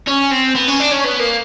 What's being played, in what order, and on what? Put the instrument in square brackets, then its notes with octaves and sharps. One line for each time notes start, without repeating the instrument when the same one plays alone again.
[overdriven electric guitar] C#4
C4
B3
C#4
D4
C#4
B3
A#3